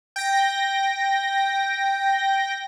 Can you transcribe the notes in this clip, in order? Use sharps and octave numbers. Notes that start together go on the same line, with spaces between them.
G5 A#6